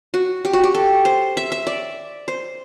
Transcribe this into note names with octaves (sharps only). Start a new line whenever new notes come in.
F#4
G4
F#4
G4
A4
C5
E5
E5
D5
C5